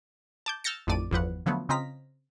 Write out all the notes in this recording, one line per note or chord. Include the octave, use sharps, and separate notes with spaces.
A5 D6 G6
E6 F6 G6 A6 A#6 C#7
A1 F2 D#3 A3 D5 D#7
G1 E2 F3 B4 F#5
D3 F3 F#3 A3 B3
C#3 C4 F4 D#5 A#5 B6